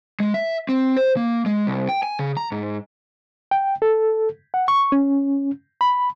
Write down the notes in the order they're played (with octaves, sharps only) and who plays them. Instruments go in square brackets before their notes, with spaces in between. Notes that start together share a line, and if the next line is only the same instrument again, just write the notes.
[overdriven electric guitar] G#3
E5
C4
C5
A#3
G#3
C2
G5
G#5
C#3
A#5
G#2
[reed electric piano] G5
A4
F#5
C#6
C#4
B5